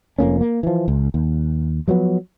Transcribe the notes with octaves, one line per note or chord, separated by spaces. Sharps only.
F1 F2 A#3 C#4
A#3
E3 F3
C#2
D#2
F3 F#3 A3 B3